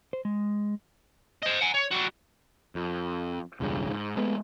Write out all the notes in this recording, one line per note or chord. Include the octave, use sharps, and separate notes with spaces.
C5
G#3
C5 D#5
F#5 G#5
C#5
G3 F#4
F2
E1 C#2 G2 C#3
G#2
G#3 A3 B3